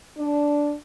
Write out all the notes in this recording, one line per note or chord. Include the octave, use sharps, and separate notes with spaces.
D4